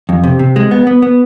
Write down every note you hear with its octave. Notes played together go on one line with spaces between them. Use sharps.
F2
C3
C3
G#3
B3
B3
B3